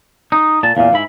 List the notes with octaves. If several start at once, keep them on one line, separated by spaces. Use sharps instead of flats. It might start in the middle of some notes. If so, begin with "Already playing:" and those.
D#4
A#2 A5
E2 A#2 F5
G#2 E4 B5